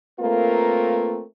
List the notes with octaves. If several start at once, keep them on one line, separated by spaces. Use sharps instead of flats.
A3 A#3 C4 F4 A#4 B4